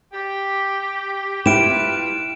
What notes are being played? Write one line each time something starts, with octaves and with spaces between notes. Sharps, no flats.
G4
G3 E4 F4 G4 B4 D7 E7